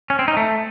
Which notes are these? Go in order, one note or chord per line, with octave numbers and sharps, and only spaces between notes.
C#4
C4
D#4
A3